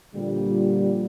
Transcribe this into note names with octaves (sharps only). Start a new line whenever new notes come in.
A#2 D3 F3 G3